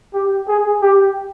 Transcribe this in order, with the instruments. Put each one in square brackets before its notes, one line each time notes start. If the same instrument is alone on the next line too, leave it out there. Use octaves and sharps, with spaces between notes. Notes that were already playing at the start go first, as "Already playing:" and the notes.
[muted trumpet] G4
G#4
G4